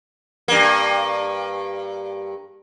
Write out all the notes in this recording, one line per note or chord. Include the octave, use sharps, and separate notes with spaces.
G2 A#3